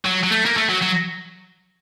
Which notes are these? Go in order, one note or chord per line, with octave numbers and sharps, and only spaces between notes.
F#3
F#3
A3
A#3
A3
F#3
F#3